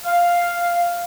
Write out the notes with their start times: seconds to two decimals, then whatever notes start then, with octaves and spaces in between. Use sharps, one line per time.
0.03 F5